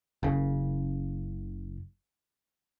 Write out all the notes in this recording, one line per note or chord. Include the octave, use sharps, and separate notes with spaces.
F#1 C#3